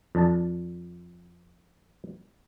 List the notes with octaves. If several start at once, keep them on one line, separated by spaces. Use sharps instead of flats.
F2 D4 A5